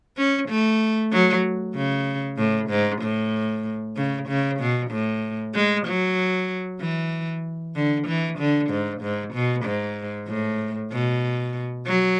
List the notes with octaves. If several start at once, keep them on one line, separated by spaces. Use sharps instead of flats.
C#4
A3
F#3
C#3
A2
G#2
A2
C#3
C#3
B2
A2
G#3
F#3
E3
D3
E3
D3
G#2
G#2
B2
G#2
A2
B2
F#3